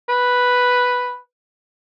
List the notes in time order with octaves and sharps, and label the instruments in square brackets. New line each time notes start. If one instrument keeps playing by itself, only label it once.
[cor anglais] B4